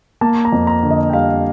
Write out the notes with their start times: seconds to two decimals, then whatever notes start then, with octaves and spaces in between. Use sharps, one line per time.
0.21 A#3 A5
0.45 A#5
0.52 F2
0.67 A#5
0.83 D3
0.91 D#5
1.10 G5
1.13 G3 F5